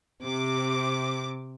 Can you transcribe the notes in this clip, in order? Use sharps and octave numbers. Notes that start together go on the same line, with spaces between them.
C3 D6